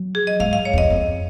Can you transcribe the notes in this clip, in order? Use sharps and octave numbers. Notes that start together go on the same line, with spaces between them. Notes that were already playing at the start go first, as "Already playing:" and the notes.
Already playing: F#3
G#4
D#5
G#2 F5
F5
C#5
F2 D#5
F2